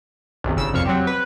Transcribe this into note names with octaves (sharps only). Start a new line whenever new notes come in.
B1 F#2 C3 D#3
G1 C#3 E6
C2 F2 F5 C#6 C#7
F#3 C4 G4
B4